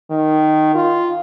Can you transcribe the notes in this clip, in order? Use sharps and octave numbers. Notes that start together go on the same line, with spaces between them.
D#3
F4